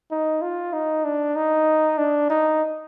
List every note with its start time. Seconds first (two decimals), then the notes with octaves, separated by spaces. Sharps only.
0.11 D#4
0.42 F4
0.73 D#4
1.04 D4
1.36 D#4
1.98 D4
2.30 D#4